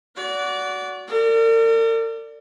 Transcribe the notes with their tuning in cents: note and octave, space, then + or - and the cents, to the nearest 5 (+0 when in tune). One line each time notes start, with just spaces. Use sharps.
F#4 +0 D5 -25
A#4 -45 D5 +0